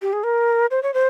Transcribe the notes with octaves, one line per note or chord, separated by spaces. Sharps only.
G4
G#4
A#4
C5
C#5
C5